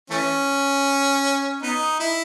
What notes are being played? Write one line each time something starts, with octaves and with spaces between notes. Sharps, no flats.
E3 A3 C#4
B3 D#4
E4